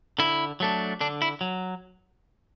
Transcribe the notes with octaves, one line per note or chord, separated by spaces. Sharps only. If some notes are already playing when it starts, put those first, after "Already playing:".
D3 E4
F#3 A3 D4
D3 D4
E4
F#3